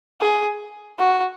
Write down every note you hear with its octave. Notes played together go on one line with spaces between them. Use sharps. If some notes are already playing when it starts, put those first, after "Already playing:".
G#4
F#4